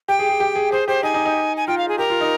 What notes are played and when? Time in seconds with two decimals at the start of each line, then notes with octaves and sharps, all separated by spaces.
0.08 G4 G5
0.19 G#4
0.29 G#4
0.40 G4
0.56 G#4
0.72 G#4 C5
0.88 G4 C5
1.03 D#4 G#5
1.14 D#4
1.25 D#4
1.57 G#5
1.68 F4 G5
1.78 F5
1.88 G#4
1.98 G4 A#4
2.10 F4
2.21 D#4